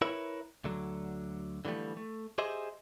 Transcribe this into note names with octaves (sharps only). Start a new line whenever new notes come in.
E4 A#4 B4 C#5 E5
D2 D3 F#3
D3 E3 F3 G3 A3
A3
G4 G#4 C5 D#5 E5